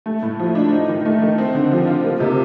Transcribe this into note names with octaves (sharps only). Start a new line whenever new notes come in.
A3
A2
F3
D4
D#4
D#3
A3
D#3
C4
D3
F3
F4
A#3
C3